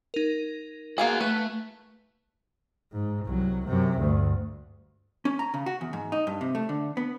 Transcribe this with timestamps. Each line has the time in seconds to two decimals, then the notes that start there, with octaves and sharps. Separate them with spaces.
0.14 D#4 A#4
0.98 A#3 B3 F#4 G#4 F5
1.21 A3 B4
2.93 G#2
3.26 C2 F#3
3.67 F#2 C3
4.00 D2 G2
5.25 C#4
5.39 A#5
5.54 C#3
5.66 F#4
5.81 E2
5.93 G#2
6.12 D#4
6.27 G2
6.41 C3
6.55 A3
6.69 D3
6.97 B3